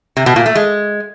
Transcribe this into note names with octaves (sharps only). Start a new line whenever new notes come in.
C3
B2
A#2
A3
G#3